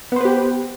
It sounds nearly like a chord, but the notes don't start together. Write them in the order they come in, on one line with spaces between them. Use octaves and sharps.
B3 C5 B4 G4